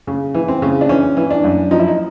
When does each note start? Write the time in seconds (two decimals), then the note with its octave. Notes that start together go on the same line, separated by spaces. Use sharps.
0.07 C#3
0.34 E3
0.48 C4
0.62 C#3
0.81 D4
0.89 E3 C#4
1.17 E3
1.30 D4
1.44 F#2
1.71 F3 D#4
1.79 E4
1.88 D#4